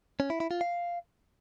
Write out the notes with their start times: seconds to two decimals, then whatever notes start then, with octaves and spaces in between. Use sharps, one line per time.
0.20 C#4
0.30 E4
0.40 E4
0.51 F4
0.61 F5